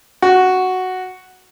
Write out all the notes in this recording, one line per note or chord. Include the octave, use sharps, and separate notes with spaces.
F#4